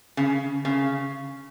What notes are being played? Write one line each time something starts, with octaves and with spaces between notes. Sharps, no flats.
C#3
C#3